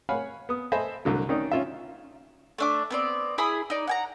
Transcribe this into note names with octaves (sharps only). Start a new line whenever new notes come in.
C#5 F5 F#5 G#5 B5
B3 D#6
A4 C5 D#5 E5 G#5 B5
C2 D3 F#3
D#3 C#4 D#4 D5
C#4 F4 E5
A3 D4 D6
B3 C4 D5
E4 G#4 B5 D#6
D#4 D5
F#5 G#5 A#5